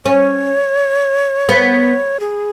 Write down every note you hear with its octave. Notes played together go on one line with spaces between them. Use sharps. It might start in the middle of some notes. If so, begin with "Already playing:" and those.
C#4 C#5
B3
G#4